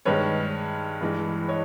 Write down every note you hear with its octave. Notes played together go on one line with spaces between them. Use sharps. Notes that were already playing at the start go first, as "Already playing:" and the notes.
G2 D#3 G#3 B4 C#5
G2 E3 G#3
C#5 D#5